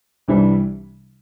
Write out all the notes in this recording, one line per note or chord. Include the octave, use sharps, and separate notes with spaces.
C2 C3 E3 G3 D4